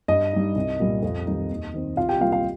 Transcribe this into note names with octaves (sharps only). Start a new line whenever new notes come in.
G2 D#5
G3 D#4
C2
A#2 G3
F2
D#3 G3 D#4
D#2
D#3 C4
C2 F4 F5
G4 G5
C3 G3 A#3 F4 F5
F4 F5